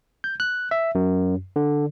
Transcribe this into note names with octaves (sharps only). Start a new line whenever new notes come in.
G6
F#6
E5
F#2
D3